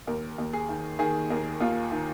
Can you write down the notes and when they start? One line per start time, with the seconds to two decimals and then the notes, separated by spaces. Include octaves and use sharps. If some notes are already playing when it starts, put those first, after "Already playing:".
0.07 D#2 A#4
0.38 D#2
0.53 G#4
0.69 D#3
0.99 D#3 G#4
1.30 D#2 A#4
1.61 D#2 F4
1.91 D#3